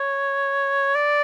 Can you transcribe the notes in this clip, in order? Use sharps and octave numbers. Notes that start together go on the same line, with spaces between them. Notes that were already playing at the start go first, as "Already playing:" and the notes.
Already playing: C#5
D5